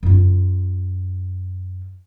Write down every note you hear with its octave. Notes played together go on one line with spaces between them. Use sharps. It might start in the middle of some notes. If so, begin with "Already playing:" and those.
F#2 F4